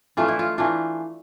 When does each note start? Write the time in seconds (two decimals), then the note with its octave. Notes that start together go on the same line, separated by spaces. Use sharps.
0.17 E3 A3 D4 F4
0.28 E4
0.39 F4
0.58 E3 A3 D4 F4